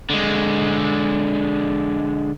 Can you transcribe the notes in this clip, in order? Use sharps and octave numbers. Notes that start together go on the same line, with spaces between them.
D3 G#3